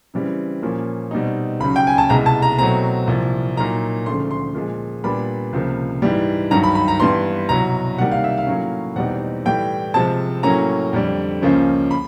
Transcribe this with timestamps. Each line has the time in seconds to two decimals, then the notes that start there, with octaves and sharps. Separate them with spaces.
0.14 C#3 E3 G3 C4
0.62 A#2 F3 A#3 C#4
1.11 B2 G3 C4 D#4
1.60 C#2 C#3 F#3 B5
1.76 G5
1.87 G#5
1.98 A5
2.10 C2 B2 G#3 A#5
2.26 A5
2.42 A#5
2.58 B2 F#3 A3 C4 A#5
3.08 C2 A#2 F3
3.57 A#2 F#3 A#3 D#4 A#5
4.06 D2 C#3 F3 A3 D4 C6
4.31 C6
4.55 A#2 F3 G#3
5.04 A#2 G3 B3 D4 B5
5.53 C#2 C3 F3 A#3
6.02 G#2 E3 G3
6.51 G2 D#3 F#3 A#5
6.64 B5
6.75 B5
6.88 A#5
7.00 G2 E3 G3 B3 C6
7.49 C2 B2 F#3 A#5
7.98 C3 D#3 G3 A#3 D#4 F#5
8.11 F5
8.24 E5
8.38 F5
8.47 A2 F#3 A#3 C#4
8.96 E2 B2 G3 C4 D#4 F#5
9.45 A2 E3 G3 G5
9.94 C3 F3 G#3 C4 A5
10.43 A2 F#3 A#3 C#4 A#5
10.93 F2 D3 G3
11.42 C#2 C#3 F3 A#3 C#4
11.91 B5